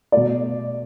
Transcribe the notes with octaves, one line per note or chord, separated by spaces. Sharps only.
B2 A3 D5